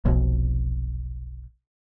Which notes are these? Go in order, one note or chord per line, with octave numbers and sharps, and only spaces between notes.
F1 B1 F2